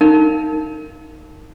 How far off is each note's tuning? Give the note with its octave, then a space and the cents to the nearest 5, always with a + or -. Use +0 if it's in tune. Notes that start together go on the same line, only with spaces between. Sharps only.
D#4 +0 A#4 -25 F5 +0